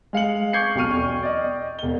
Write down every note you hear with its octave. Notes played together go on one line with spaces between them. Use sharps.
G#3 F5 C#7 F#7
C#6 D6 G6 G#6 C7 C#7
B1 F#3 G5 C#6 F6 D#7
E2 G5 C#6
D5 D#5
E1 G7